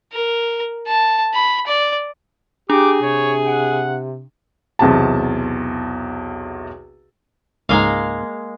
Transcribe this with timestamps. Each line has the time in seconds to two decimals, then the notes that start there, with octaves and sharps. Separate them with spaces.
0.13 A#4
0.88 A5
1.34 B5
1.67 D5
2.70 D4 G4 G#4 D6
3.02 C3 C#5
3.46 F#5
4.79 B1 E2 C3 A5
7.69 C#2 G#2 G#3 A#3 F5